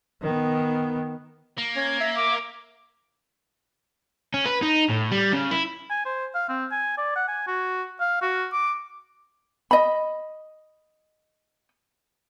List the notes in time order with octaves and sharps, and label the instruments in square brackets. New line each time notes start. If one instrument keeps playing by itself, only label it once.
[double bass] D#3 B3
[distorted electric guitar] A#3
[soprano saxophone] C#4 [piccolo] G#6
[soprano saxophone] E5
[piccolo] D6
[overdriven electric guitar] C#4
B4
D#4
A2
G3
C#3
E4
[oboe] G#5
C5
F5
C4
G#5
D5
F#5
G#5
F#4
F5
F#4
D6
[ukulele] D#5 B5